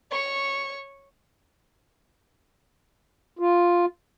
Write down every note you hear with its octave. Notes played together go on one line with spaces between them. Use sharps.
C#5 C#6
F4